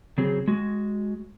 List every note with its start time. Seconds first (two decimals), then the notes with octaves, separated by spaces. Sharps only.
0.18 C#3 F#3 C4 G#4
0.48 G#3 F#4